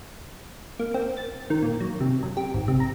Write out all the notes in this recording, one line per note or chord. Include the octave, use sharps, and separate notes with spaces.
A#3
C4
A6
D#3
A#2
F#3
C3
F#2
G4
G#1
C3
A#5